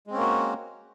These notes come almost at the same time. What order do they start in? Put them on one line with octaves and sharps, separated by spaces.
G#3 C4 C#4 A#3 F#4